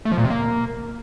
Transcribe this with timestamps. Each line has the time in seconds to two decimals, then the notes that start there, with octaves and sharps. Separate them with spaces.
0.05 A3
0.12 F3
0.18 A#2
0.24 C3
0.30 A#3